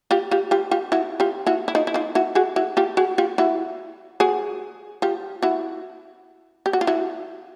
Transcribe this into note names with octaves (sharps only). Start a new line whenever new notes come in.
F4 G4
F4 G4
F4 G4
F4 G4
E4 F#4
F4 G4
E4 F#4
E4
D#4 F4
E4
D#4 F4
E4 F#4
F#4 G#4
E4 F#4
F4 G4
F#4 G#4
F4 G4
E4 F#4
F#4 G#4
F4 G4
E4 F#4
G4
F#4
F4
E4 F#4